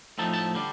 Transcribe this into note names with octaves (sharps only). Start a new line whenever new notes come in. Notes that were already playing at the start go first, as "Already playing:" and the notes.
A2 F3 A3 C4 D#4 A5
A5
D3 G3 D4